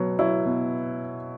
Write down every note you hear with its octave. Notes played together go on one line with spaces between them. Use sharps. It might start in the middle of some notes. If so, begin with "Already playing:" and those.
Already playing: B2 F#3 B3
F#3 E4
B2